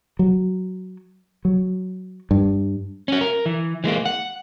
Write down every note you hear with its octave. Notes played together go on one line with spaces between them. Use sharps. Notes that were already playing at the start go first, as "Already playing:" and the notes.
F#3
F#3
G2
C#4 F#4
A#4
E3
E3 G#3 A#3
F#5